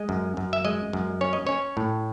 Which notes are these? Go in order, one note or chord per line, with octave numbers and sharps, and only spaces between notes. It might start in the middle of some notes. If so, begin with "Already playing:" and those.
Already playing: G#3 D#5
F#2
F#2
E5
G#3 D#5
F#2
C#4 C#5
D#5
C#4 C#5
A2